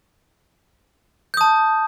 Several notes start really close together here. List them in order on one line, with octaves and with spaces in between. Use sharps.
G6 D#6 A5